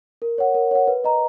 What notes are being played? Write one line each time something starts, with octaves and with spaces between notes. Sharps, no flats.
A#4
C#5 F#5
A#4
C#5 F#5
B4
D#5 A#5